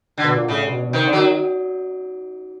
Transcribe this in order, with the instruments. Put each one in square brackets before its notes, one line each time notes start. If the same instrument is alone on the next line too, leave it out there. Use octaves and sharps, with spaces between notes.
[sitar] D3
[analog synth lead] B2
A#2
[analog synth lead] A2 [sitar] C#3
[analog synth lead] C3
B2
B2
[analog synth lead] C3 [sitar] D#3
[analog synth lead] D3
[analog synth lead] D#3 [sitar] F#3